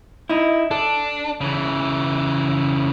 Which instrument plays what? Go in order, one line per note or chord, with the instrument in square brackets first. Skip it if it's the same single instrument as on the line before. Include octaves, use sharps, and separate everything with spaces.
[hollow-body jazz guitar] D#4 E4
[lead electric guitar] D4 [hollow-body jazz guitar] A4
[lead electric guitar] C#3 E3